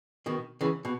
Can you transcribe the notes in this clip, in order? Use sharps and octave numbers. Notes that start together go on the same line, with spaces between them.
B2 D#3
C#3 E3
B2